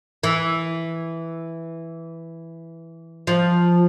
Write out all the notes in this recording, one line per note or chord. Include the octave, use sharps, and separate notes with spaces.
E3
F3